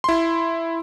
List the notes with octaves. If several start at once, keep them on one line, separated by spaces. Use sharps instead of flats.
E4 C6